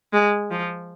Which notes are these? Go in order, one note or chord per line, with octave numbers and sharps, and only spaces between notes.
G#3
F3